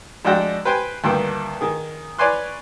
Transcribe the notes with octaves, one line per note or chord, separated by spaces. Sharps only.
F2 G#3 D4 F#4 F#5 G5
B4 C5 G5 G#5
D2 G2 D#3 A#3 G5
D#3 G#4
B4 C#5 D5 G#5 C6 F#6